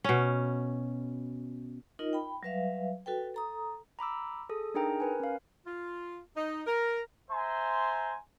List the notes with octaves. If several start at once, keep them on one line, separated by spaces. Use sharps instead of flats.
B2 C#4
D#4 F4 A#4 D#5
G5 B5
F#3 G3 B4 E5 F5
F#4 A4 B4 G5
A4 A#5 D#6
A#5 B5 D6 E6
G#4 A4 D#6
D4 D#4 G#4 A#4 G5 A#5
A#4 B4 G#5
C#4 F5
F4
D#4
A#4
C5 E5 G#5 A#5 C6